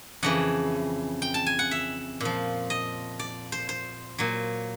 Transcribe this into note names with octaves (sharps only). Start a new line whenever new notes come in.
F2 C#3 E3 F#5
G5
A5
G#5
F#5
E5
A#2 F3
D#5
D5
C5
C5
A#2 F#3